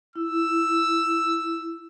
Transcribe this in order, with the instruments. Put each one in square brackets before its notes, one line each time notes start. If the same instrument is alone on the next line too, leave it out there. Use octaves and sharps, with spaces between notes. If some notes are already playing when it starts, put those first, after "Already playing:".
[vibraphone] E4 [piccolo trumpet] E6